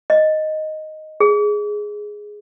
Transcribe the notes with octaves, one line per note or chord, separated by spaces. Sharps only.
D#5
G#4